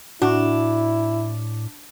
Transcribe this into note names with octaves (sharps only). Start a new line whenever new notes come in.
A2 D4 E4 F#4